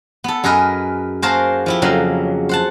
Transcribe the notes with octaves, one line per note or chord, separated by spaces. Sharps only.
B3 A4
F#2 G#4 A#4 B4 D#5
A#3 F#4 G#4 A#4 C5 A5
F3 E4 G4
F2 C#3 F#3 A#3
C5 F#5 A5